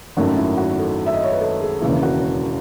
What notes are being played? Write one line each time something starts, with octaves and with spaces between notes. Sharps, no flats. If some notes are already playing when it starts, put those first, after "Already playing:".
G#1 F#2 D#3 A3 C#4 F#4
E4
F#4
A4
E5
D#5
C#5
B4
A4
G#4
E1 D#2 C#3 E3
F#4